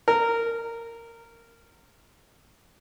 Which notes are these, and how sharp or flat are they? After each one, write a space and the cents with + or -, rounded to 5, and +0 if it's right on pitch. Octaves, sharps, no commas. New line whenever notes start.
A#4 -15